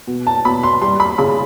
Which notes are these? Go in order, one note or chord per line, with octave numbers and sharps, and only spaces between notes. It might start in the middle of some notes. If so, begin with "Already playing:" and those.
B2
A5
B2 B5
C6
G3 C6
B5
C#3 B5